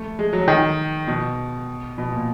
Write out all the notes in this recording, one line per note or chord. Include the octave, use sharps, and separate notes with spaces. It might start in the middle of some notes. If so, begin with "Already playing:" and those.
Already playing: A3
G#3
F#3
D#3
B2
B2
A#2